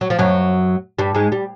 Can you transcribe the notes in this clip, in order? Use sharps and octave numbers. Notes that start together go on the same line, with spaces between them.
F#3
F3
F#2 F#3
G2 G3
G#2 G#3
G3